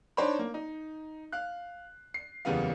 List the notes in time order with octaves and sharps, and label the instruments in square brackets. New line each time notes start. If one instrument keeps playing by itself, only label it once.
[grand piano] D4 D#4 C5 C#5 B5
A#3
D#4
F5 F#6
C7
F#1 E2 C#3 G3 B3 F5